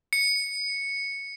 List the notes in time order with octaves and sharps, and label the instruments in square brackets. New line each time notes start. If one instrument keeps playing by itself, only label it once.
[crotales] C#7